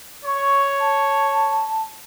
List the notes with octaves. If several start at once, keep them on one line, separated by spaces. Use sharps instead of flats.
C#5 C#6
A5